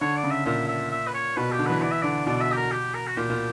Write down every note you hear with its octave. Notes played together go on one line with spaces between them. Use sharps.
D3 C#5
D5
C#3
E5
A#2 E5
E5
E5
B4
C#5
B2 B4
G4
D3
E3 B4
E3 D5
E5
D3 D5
B2 D5
D5
E5
G4
A#4
G4
A#4
F#4
A#2 G4
A#2